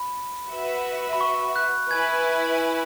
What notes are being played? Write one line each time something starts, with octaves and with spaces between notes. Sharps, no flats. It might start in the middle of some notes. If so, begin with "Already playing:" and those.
Already playing: B5
F#4 B4 E5
B5
C#6
F#6
E4 B4 G#5 G#6